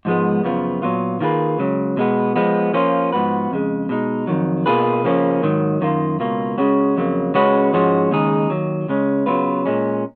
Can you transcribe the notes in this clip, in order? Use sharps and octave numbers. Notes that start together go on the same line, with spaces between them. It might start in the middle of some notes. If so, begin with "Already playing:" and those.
G#2 F3 G#3 B3
F#2 C#3 F3 B3 F4
A#2 F#3 B3 F4
D#3 A#3 F4 G#4 B4
C#2 C#3 F#3
B2 G#3 B3
F3 G#3 B3
F3 A#3 C#4 F4
G#2 F3 B3 F#4 B4
F2 C#3 G#3
B2 G#3 D#4
F2 D#3 F#3
B2 A#3 F4 G#4 B4
C#3 F3 A#3 C#4
G#2 D#3 F#3
F#2 D#3 A#3 F4
C#2 B2 A#3 F4
C#3 G#3 C#4 F#4
F2 C#3 F#3 A#3
C#3 G#3 C#4 F#4 B4
G#2 F3 G#3 C#4 F#4
D#2 C#3 G#3 D#4 G#4
D#2 D#3 F#3
C#2 C#3 G#3 C#4
C#3 F#3 B3 F4 B4
A#2 G#3 C#4